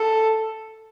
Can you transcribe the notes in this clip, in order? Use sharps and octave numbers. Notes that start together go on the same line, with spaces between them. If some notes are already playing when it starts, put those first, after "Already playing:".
Already playing: A4